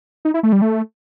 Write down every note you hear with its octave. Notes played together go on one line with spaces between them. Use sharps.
D#4
E4
A3
G3
A3